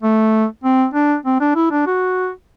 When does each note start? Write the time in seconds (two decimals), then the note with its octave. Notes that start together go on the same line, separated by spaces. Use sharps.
0.02 A3
0.64 C4
0.94 D4
1.26 C4
1.40 D4
1.55 E4
1.71 D4
1.87 F#4